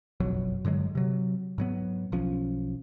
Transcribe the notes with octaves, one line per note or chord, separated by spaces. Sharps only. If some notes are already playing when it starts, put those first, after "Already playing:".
F#1 B1 F2 F#3
G2 D3 F#3 G#3
C3 F#3
G#2 F#3 B3
B1 F3 C#4